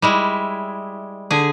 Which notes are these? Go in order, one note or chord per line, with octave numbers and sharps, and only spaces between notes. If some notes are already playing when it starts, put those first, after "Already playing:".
G3 G#3 E4
D3 G#4